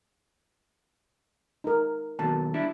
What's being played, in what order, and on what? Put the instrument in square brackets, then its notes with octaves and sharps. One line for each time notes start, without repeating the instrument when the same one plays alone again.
[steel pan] D#4 A#4
[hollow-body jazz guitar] D#2 B2 F#3 [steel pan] A5
[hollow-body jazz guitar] G3 D4 E4